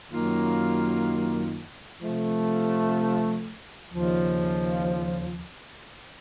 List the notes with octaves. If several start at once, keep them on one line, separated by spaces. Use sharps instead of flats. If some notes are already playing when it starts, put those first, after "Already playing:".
F#2 D#3 F#3 A#3 F4
C3 F3 A3
D#2 C#3 F3